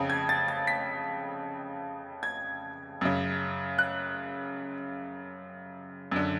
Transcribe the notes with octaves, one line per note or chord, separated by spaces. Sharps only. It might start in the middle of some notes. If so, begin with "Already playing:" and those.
Already playing: F2 C#3
G#6
A6
A6
B6
G#6
F#2 C#3
F#6
F#2 D3